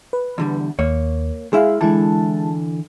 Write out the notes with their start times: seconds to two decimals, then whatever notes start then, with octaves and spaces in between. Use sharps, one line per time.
0.13 B4
0.38 E2 D3 G3
0.79 D#2 A#3 C#5
1.53 G#3 E4 G#4 E5 F5
1.81 D3 E3 G#3 E4 A5